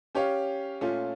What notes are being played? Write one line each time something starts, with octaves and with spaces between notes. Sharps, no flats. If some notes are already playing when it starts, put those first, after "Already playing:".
C#4 G4 C#5 F5
A#2 A3 C#4 F4